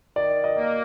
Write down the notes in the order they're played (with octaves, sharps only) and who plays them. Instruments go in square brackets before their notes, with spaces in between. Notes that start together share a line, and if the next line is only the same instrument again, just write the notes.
[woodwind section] D#3 [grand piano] D5
[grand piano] D#5
[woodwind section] A#3